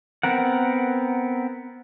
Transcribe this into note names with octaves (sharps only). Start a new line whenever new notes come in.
B3 C4 A#4 F#5